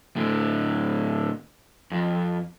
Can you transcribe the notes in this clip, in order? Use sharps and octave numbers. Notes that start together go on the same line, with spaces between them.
A2 D3
F2